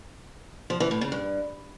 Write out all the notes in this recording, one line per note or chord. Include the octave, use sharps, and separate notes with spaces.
F3
E3
A2
C#3
G2